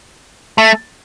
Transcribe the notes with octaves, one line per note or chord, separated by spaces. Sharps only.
A3